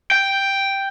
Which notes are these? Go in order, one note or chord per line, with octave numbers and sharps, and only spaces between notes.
G5